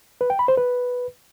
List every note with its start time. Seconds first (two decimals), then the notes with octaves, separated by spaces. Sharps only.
0.21 B4
0.30 G5
0.39 B5
0.48 C5
0.57 B4